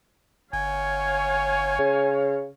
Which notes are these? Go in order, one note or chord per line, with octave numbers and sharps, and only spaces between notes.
G1 C#5 F5 G#5
C#3